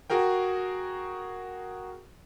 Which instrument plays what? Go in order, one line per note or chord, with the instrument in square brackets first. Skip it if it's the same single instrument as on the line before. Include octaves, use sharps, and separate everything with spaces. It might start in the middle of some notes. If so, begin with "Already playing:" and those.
[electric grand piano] F#4 G#4 A#4 G5